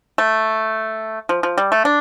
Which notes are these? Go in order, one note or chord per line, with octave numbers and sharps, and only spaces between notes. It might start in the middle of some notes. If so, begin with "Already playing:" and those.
A3
F3
F3
G3
A3
D4